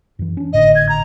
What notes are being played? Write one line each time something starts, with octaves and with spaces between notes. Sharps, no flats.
F#2 E3
C#4 D4
G#1 A2 D3 D#5
G#6
A#5